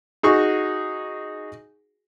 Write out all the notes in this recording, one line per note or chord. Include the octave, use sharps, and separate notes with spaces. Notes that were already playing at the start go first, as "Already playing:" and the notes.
D#4 F#4 G#4 C#6